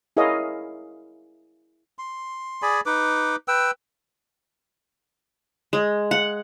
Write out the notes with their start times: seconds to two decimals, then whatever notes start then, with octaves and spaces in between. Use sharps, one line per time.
0.17 E4 G#4 A#4 C#5 D#5 F5
1.99 C6
2.62 G#4 D5 G#5 B5
2.86 D#4 B4 D6
3.48 B4 G5 E6
5.73 G#3
6.11 F#5